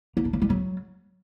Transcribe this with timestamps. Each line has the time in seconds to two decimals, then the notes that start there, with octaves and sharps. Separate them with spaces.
0.17 A#3
0.25 D4
0.33 A#3
0.42 G3
0.50 F#3